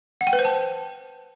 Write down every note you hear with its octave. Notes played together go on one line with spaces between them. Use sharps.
F#5
G5
B4
C5
A5